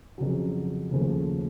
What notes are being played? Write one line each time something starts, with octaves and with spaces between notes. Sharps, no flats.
F2 C#3 F#3
D#2 C#3 F3 A3